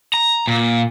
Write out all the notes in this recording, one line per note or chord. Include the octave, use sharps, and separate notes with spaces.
A#5
A#2